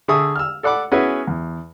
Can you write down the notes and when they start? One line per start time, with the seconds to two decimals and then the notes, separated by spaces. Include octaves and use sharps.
0.08 D3 G#4 E5 C#6 D#6
0.36 E6 F6
0.63 A4 D5 F#5 B5 D6
0.91 B3 C#4 E4 F#4 G#4 B4
1.27 E2